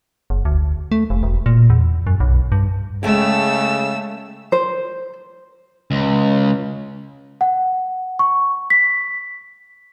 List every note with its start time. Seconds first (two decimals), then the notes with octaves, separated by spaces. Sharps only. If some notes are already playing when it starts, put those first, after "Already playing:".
0.30 F#1
0.45 D2
0.92 A3
1.10 F1
1.23 E1
1.46 A#2
1.70 E2
2.07 F#2
2.20 B1
2.52 G2
3.03 C#3 G#3 A3 E5 G5 E6
4.52 C5
5.91 C#2
7.41 F#5
8.19 C#6
8.70 B6